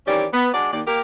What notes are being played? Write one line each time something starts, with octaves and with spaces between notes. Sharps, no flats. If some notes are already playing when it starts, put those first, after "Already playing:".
D#3 E3 C4 C#4 G4 D5
B3
G#3 D4 F#4 D5
D#2 D5
A#3 G4 A#4